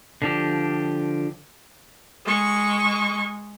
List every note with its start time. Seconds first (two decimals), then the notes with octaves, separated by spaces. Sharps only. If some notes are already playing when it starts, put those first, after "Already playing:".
0.22 D3 F3 G4
2.26 G#3 C#6